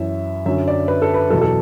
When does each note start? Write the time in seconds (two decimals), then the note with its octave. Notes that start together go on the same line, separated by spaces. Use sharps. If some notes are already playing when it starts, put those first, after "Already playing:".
Already playing: F#2 E3 E5
0.46 F#2 D3 F#3 E5
0.68 D5
0.88 B4
1.02 A4
1.14 B4
1.30 E2 B2 F#3 A4
1.42 A4